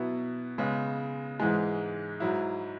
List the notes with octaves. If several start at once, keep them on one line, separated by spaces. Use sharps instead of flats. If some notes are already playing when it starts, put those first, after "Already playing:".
Already playing: B2 F#3 B3 E4
C#3 G#3 B3
G#2 E3 G#3
G#2 F#3 E4